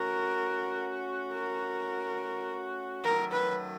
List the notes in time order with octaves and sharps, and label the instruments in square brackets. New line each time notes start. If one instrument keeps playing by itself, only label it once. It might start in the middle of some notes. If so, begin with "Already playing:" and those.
Already playing: [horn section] A3 C#4 F#4 [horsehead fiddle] A#4
[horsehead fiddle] A#4
[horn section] F#2 D#3 F#3 A3 [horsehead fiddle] A#4
[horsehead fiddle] B4